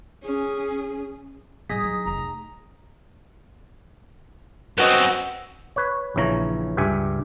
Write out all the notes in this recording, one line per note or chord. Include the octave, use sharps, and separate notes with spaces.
C#4 G#4
A2 G3 D#4 G#4 D#6 A#6 B6
F#3 E4
F1 F2 A#5
A3
F#2 B3 C4 F#4 D#5
B4 C#5
A#1 C#3 E3 C#5 A#5
C#2 G2 G4 E5 G#5